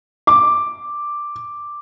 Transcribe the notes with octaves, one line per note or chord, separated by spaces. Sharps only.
D6